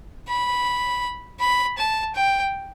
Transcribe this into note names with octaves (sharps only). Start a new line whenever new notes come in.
B5
B5
A5
G5